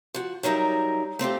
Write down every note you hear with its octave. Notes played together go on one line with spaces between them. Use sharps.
F3 F#4
F#3 G3 D#4 A#4 E5
A3 C4 F4 G4